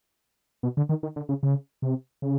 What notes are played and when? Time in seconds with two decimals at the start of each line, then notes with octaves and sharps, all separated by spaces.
0.63 B2
0.77 D3
0.89 D#3
1.03 D#3
1.16 D3
1.29 C#3
1.43 C#3
1.82 C3
2.22 C#3